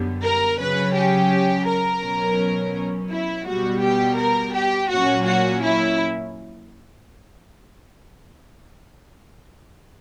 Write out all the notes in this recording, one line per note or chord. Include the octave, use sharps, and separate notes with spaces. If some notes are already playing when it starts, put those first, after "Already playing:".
Already playing: F#2 D3 G3 B3
A#4
C#3 F#3 C#4 B4
G4
A#4
B2 F#3 C#4
E4
B2 G3 B3 F#4
G4
A#4
G4
A#2 F#3 A#3 C#4 F#4
F#4
E4